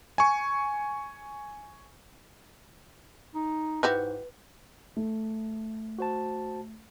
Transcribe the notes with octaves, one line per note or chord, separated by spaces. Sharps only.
G#5 C#6
D#4
G#2 E4 F#4 G4 B4 G6
A3
F#4 C5 A5